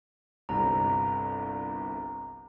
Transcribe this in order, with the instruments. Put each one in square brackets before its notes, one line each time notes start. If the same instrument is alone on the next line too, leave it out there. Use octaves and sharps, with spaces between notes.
[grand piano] G1 C2 C3 [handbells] A#5